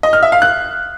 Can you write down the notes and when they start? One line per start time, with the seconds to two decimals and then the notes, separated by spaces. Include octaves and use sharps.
0.03 D#5
0.13 F6
0.23 E5
0.32 F5
0.42 F#6